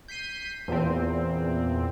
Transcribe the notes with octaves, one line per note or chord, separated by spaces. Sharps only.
G6 B6 C7 D#7
E2 A#2 C4